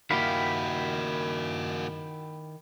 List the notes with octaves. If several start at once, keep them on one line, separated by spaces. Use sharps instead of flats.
D#3 A#3 E4 F#4 G4 F5 B5